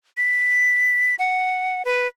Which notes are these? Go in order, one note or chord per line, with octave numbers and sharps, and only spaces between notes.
B6
F#5
B4